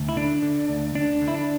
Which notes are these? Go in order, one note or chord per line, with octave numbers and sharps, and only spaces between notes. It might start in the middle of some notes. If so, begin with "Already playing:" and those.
Already playing: D2
E4
D3 D4
D3
D2
D2 D4
D3
E4
D4